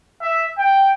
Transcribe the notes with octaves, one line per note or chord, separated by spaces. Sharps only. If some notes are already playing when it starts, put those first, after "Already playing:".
E5
G5